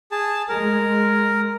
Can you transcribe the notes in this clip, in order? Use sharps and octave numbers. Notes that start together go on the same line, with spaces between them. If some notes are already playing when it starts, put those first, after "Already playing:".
G#4 A5
G#3 A#4